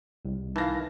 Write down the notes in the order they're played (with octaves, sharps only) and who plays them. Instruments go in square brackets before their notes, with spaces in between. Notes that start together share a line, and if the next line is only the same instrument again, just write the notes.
[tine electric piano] C2
[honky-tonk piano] D#3 A#6 [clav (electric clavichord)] E3 [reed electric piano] F5 A5